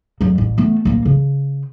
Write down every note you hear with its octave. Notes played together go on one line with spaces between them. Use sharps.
F2 F#3
A1
A3 B3
D#1 A#3
C#3